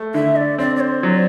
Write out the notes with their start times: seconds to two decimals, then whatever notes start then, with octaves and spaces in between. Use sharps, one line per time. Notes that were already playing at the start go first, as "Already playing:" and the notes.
Already playing: A3
0.14 D3 E5
0.36 D5
0.58 C4 D5
0.76 D5
0.80 C5
1.03 F#3 D5